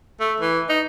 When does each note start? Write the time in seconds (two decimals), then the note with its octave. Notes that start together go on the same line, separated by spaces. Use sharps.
0.20 A3
0.40 E3
0.69 D#4